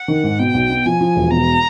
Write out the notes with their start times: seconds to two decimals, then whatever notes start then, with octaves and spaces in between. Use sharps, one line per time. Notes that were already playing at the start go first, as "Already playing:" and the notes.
Already playing: F#5
0.08 D#3
0.24 G#2
0.39 B2 G5
0.54 B1
0.70 B2
0.86 F3 G#5
1.01 F3
1.16 E1
1.31 B2 A#5